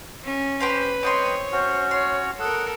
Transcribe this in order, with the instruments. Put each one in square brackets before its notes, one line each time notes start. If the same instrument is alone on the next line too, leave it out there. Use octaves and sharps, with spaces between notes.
[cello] C#4
[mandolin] G4 C5 F5 [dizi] B4
[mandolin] C4 G5 C6 [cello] C#5 [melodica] D#5
[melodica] C#4 F#4 [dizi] C5
[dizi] C#5 [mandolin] C6
[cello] A4 A#4 [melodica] F#5 [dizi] D#6